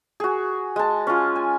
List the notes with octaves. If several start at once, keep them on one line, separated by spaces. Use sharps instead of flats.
F#4 G#4
G#3 A5
C#4 F4
G#5